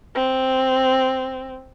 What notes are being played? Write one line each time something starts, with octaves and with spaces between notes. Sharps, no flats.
C4